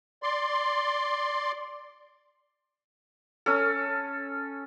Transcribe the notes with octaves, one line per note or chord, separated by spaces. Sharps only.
D5 C6
C#4 A4